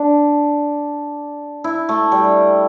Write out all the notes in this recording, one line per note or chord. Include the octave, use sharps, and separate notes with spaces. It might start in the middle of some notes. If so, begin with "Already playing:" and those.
Already playing: D4
E4
A3
G3